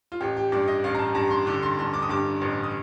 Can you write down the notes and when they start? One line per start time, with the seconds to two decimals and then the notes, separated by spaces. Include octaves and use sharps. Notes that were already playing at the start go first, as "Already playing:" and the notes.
0.12 F4
0.21 A1 G4
0.37 G4
0.52 G2 D5
0.67 D#5
0.84 A1 F5
0.95 A#5
0.99 A5
1.15 G2 A#5
1.31 C6
1.46 D3 D6
1.63 C6
1.79 G2 C6
1.94 D6
2.02 D#6
2.09 G2 D6
2.41 A1
2.63 D#6